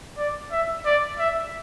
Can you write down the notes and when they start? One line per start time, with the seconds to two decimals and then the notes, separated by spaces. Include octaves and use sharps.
0.17 D5
0.51 E5
0.85 D5
1.18 E5